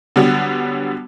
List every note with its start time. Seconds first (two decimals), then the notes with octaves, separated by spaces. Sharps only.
0.16 D3 F#3 G3 B3